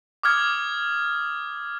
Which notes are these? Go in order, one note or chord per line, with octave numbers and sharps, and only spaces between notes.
D6 D#6 F6 G#6